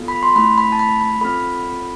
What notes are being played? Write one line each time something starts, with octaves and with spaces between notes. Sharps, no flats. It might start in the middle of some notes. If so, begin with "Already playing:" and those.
Already playing: B3 F4 A4
B5
C6
A3 C4 E4 B5
B5
A5
B5
B5
C4 F4 A4 B5